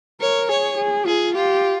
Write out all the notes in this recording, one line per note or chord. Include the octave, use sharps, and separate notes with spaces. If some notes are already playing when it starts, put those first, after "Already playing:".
A#4 C#5
G#4 C#5
G#4
F4 G#4
F4 G4